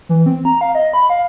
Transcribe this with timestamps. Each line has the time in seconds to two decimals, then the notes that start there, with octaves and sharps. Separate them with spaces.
0.09 E3
0.26 C4
0.45 A#5
0.61 F5
0.75 D#5
0.93 B5
1.10 F5